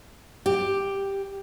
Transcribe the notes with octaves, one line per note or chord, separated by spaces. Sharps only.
G4